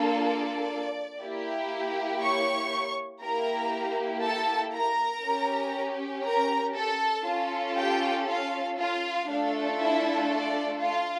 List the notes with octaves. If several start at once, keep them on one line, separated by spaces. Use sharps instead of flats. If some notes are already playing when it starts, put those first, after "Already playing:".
Already playing: A#3 D4 F4 A4
D5
A#3 E4 G4
C#5 C#6
A#3 E4 G4 A#4 A#5
A4 A5
A#4 A#5
C#4 G4
A#4 A#5
A4 A5
C#4 F4 A4
G4 G5
F4 F5
F4 F5
A3 D4 F4 A4
E4 E5
D5
F4 F5